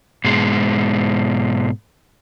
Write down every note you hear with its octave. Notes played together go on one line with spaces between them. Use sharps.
G#2 B2 G#3